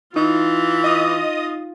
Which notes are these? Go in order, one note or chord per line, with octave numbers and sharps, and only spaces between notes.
E3 D#4 F4
D#5 D#6